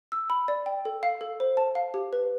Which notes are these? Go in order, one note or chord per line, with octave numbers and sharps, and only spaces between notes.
E6
B5
D5
G5
A4
F5
A4
C5
A5
F5
G4
B4